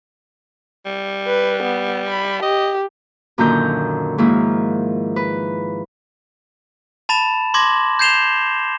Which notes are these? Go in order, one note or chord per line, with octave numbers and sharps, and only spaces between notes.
G3
B4
B3
B5
G4 D#5
F#2 A#2 D3 D#3 A#5 G6
G#2 D#3 F3 A#3 E4
B4
A5 B5 A6 E7
C6 D6 G#6 A#6 F#7
G6 G#6 C7 E7 F7 G7